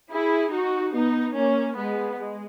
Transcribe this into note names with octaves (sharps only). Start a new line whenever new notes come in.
E4 G#4
D#4 F#4
B3 D#4
A#3 C#4
G#3 B3
G#3